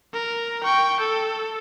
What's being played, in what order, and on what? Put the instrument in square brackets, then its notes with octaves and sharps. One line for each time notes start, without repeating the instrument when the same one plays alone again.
[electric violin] A#4
G5 C#6
A4